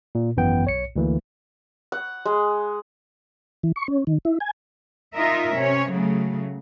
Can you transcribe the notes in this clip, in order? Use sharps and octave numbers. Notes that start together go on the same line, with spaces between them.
A#2
G#1 F#2 E3 B3 G5
B1 C#5 C#7
D2 E3 A#3
F#5
G#3
E3
C#6
C#4
D#3
E4
G#5
D#4 F4 A#4 D#5 E5
C3 C#4 C#5
C#3 F#3 A3